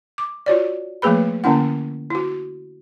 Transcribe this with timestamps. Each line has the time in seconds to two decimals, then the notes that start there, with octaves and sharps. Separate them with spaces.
0.18 D6
0.46 F4 F#4 C#5 D5
1.02 F3 A3 A#3 G#4 B4 B5
1.44 D3 A#3 C#4 E4 F#5
2.10 E4 F#4